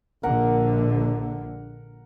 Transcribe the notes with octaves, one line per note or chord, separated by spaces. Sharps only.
A#1 D3 A#4 F#5